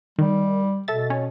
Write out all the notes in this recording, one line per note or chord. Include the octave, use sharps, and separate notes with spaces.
D#3 G3
B2 A4 E5 A6
C#4